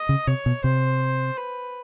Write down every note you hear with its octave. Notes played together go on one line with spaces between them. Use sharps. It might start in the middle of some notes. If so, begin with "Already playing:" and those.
Already playing: D#5
C#3
C3 C#5
B2
C3 C5
B4